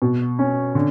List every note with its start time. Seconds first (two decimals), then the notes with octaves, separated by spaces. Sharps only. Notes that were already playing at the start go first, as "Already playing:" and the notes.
0.02 B2
0.39 C#4
0.75 D3